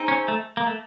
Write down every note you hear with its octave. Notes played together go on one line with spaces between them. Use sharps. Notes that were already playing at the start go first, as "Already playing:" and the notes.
Already playing: C4 D#4 G#4
C#4
A3
A#3
A3